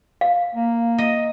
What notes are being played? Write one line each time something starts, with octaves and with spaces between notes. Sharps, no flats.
F5
A#3
D#5